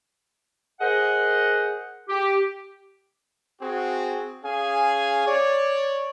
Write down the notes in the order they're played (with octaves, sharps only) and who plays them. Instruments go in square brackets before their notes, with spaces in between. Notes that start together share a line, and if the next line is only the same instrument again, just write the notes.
[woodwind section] G#4 A#4 C5 D#5 F#5
G4
[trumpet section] C4 F#4 G#4
C#4 G#4 F5 G#5
C#5 D5